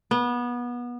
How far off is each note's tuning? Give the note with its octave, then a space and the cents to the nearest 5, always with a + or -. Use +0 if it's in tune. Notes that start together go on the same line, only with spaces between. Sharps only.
B3 -25